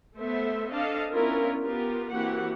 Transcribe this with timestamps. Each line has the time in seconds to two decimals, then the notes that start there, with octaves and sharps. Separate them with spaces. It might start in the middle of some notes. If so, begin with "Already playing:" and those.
0.17 A3 B3 A4 C5 E5
0.71 C4 D4 A4 D#5 F5 A5
1.12 B3 C#4 D4 E4 F4 A#4
1.62 B3 F4 G4 A#4
2.13 E3 A#3 C4 F#4 G4 F#5